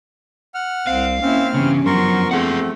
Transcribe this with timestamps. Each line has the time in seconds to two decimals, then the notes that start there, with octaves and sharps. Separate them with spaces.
0.54 F#5 F6
0.87 C2 C4 F5
1.22 A#3 C4 C#4 E4 F6
1.54 G2 C#3 E3 B3 C#4
1.86 F#2 F3 B3 A#4 C6 C#6
2.31 A3 C4 G#4 F#5